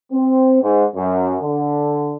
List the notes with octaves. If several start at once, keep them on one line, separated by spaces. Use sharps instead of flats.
C4
G#2
F#2
D3